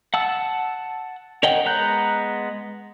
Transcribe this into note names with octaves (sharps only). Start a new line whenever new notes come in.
F#5 A5 E6
A#4 C#5 D#5 F#5 G5
G#3 B3 A#5 F#6 G6